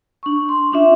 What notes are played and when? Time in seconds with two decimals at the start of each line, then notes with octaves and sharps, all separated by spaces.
0.23 D4 C#6
0.49 C6
0.72 C#4 D4 F4 E5